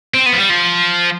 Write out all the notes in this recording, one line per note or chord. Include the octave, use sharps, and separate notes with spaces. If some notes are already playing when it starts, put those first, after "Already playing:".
C4
B3
F3
G3
F3